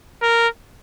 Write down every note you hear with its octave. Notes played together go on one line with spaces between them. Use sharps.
A#4